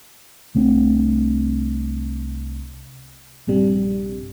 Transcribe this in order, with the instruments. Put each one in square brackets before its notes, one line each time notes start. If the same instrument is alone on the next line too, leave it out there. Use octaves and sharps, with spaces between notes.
[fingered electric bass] C2 A3 C4 D4
[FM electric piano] A#1 G2 C3 G3